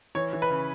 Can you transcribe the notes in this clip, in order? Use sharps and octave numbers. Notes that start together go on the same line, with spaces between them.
E3 C#5
E3
B4
C#3